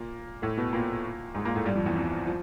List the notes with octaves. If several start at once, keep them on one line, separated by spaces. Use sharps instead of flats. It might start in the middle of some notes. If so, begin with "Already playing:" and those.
Already playing: A#2 A#3
A2 A3
B2 B3
A#2 A#3
G#2 G#3
A#2 A#3
A2 A3
G2 G3
F2 F3
E2 E3
C2 C3
F3